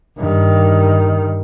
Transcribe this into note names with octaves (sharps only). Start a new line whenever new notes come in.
G2 D#3